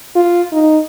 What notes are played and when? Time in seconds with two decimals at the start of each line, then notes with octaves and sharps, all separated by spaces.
0.15 F4
0.52 D#4